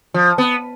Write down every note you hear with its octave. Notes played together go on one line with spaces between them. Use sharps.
F3
B3